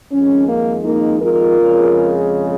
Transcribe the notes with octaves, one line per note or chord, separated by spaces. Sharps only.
F2 D#3 G#3 C#4
A#3
A#3 D#4
F4 A#4
F2 C#3 G#3